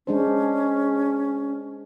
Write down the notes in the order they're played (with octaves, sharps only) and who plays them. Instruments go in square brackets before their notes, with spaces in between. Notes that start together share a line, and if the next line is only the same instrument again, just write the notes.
[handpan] G#3 D4 C5 [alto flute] C#4